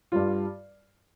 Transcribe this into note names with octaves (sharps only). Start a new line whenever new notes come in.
G2 G3 F4